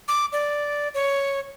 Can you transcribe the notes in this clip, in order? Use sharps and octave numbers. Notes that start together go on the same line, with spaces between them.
D6
D5
C#5